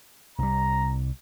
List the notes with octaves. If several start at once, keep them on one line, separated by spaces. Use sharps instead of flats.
C2 G3 A#5